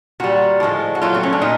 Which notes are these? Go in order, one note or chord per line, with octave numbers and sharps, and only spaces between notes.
A#2 G3 F#4
A2 F3 G#3
F#4
A#2 F#3 A3 F4
C4
C#4
D4
A#2 D#4